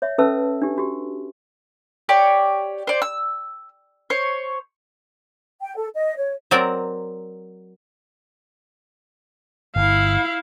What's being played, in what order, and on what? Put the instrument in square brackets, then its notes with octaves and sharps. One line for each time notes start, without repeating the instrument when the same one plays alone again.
[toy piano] C#5 E5
C#4 A4 B4 E5 A5 E6
D4 G4
F#4 G4
[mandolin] G4 C#5 D5
C5 D5
E6
C5 C#5
[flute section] G5
A4
D#5
C#5
[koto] F#3 C4 A#4 D5
[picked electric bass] G1 [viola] E4 F5